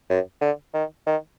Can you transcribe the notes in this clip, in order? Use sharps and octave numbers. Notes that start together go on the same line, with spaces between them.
F#2
D3
D#3
D#3